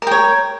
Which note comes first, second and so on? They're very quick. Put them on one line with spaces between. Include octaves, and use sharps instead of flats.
A#4 G5 C#5